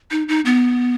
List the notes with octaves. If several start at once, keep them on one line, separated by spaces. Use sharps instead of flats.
D#4
D#4
B3